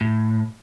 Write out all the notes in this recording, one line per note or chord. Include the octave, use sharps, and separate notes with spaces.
A2